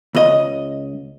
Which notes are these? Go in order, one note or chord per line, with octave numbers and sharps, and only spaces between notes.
C#2 D#5